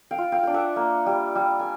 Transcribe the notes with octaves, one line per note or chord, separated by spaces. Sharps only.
F5 G5
F4
F5 G5
D4 G5
E5 F#5
A#3
G3
G3
G#5